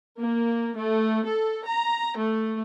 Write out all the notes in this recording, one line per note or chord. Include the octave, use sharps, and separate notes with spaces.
A#3
A3
A4
A#5
A3